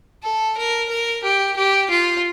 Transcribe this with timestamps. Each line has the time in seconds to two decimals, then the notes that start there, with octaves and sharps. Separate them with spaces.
0.23 A4
0.57 A#4
0.89 A#4
1.23 G4
1.56 G4
1.90 F4